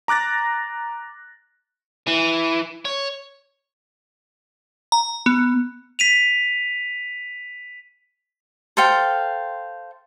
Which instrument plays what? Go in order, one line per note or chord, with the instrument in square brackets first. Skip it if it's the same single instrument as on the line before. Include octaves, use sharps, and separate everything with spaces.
[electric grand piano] A#5 D6 F#6 A6 A#6
[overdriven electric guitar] E3
C#5
[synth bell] A#5
B3
[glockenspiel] B6 D#7 F7
[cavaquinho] A4 C5 F5 G5